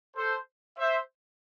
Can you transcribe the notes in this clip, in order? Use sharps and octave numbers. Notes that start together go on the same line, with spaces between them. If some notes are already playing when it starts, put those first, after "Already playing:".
A4 C5
C5 E5